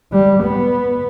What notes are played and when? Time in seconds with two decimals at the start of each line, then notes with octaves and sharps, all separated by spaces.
0.12 G3
0.43 B3